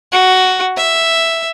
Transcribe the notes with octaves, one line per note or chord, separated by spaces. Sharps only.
F#4
E5